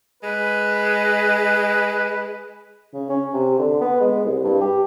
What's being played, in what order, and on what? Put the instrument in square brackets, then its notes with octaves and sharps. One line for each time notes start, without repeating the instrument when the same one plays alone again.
[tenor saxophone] G#3 [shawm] B4
[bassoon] C#3
C#4
C3
D3
B3
G#3
C2
G2
G4